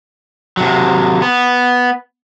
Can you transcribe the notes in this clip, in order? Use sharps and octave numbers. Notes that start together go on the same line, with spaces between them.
C3 F#3
B3